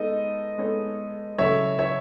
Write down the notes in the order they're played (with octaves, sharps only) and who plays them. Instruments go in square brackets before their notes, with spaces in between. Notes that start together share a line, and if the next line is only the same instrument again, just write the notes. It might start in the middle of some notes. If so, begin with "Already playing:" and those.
Already playing: [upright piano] G#3 B3 D#4 A4 [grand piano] D#5
[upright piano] G#3 B3 D#4 A4 C#5
[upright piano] C#3 F#3 C#4 E4 A4 [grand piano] C#5 E5
[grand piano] C#5 E5